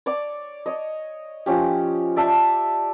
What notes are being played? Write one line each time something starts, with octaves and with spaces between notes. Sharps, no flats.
C#5 D5 D6
C#5 D#5
F3 C#4 G4
D5 E5 A5